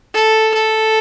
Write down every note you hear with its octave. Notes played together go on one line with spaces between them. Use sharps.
A4
A4